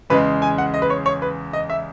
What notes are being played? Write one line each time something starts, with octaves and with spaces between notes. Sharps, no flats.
E2 C#3 G#3 B4
G#5
F#5
D#5
B4
C#5
C#5
B4
D#5
E5